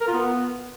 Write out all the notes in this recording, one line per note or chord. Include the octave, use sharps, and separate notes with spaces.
A#4
F4
B3